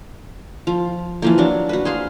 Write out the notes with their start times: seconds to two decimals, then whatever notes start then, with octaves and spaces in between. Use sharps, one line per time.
0.67 F3
1.22 E3 F3 A#3
1.38 F#3 D4
1.69 F#4 B4
1.85 G#4 C5 F5